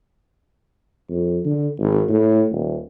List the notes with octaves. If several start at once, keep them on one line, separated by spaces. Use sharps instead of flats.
F2
D3
G#1
A2
D#1